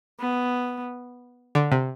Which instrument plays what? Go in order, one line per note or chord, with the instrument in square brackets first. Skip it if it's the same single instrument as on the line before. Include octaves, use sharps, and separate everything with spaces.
[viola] B3
[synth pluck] D3
C3